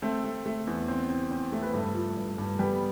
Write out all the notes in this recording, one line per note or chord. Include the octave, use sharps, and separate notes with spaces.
A3 C4 A4
A3
A3
E2
C4
C4
C4
A3
B4
G2 A3 A4
F3
G2
G2
G3 B3 G4